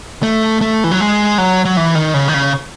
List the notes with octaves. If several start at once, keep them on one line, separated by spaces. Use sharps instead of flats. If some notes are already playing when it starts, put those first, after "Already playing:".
A3
A3
E3
F#3
G#3
F#3
F#3
E3
D#3
C#3
D#3
C#3